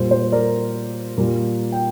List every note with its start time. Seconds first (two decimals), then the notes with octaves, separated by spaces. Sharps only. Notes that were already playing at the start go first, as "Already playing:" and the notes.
Already playing: A#2 G3 C5
0.11 C5
0.32 A#4 D5
1.17 A#2 G3
1.72 G5